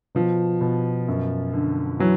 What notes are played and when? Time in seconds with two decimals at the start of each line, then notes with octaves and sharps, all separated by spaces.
0.15 B2 F3
0.61 B2
1.08 F#2
1.53 D3
1.99 E3 F#3